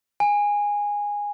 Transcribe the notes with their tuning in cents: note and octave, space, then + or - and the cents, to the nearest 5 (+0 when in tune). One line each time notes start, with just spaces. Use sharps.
G#5 -15